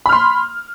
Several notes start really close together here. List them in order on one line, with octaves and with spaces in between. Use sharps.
B5 F6 C6